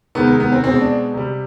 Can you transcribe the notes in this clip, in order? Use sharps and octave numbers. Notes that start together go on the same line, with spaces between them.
C3 D#3 G#3 B3
G#3
B3
C4
B2 G#3 C4
D4
C3 G3